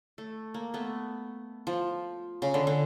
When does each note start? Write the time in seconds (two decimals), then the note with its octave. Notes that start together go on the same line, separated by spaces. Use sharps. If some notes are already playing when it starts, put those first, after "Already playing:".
0.18 A3
0.54 A#3
0.74 A3 B3
1.67 F3
2.42 C#3
2.54 D3
2.67 D3